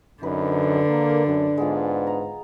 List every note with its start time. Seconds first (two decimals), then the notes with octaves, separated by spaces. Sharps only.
0.23 F#2 D3 D#4 B4
0.89 A#3 A#4
1.26 F#2 D4
1.57 G#2 G#3 B3 F4
2.07 A#5